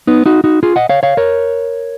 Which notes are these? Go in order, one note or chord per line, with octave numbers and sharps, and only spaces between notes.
B3 D#4
D#4 F#4
D#4 F#4
F4 G#4
D#5 F#5
C#5 F5
C#5 F5
A#4 C#5